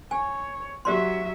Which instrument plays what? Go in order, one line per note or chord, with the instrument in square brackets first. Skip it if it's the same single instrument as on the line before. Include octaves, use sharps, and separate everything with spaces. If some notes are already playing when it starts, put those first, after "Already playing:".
[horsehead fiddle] C#5 [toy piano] G#5
[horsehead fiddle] F#3 E5 [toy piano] G4 D5 C6